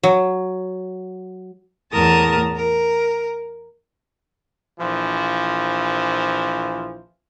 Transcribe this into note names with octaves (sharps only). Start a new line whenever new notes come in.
F#3
E2 A2 A#4 A5 D#6
A#4
A#1 E3 F3